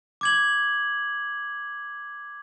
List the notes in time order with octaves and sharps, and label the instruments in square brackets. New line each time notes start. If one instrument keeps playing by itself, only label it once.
[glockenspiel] D6 G#6 F#7